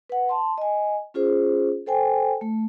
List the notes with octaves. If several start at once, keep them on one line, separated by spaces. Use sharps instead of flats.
B4 F#5
A5 C6
D#5 G#5
C#4 F4 G#4 C5
A4 C5 G5 G#5
A3